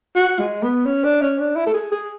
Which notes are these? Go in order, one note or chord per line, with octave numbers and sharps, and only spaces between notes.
F#4
G#3
B3
C#4
D4
C#4
D4
E4
A4
G#4
G#4